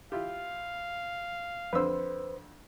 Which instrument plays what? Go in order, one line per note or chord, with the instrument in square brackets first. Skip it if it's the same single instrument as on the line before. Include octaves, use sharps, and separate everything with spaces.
[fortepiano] E4 F4 G4 [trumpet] F5
[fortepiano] F2 D3 E6 [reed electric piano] B4 C5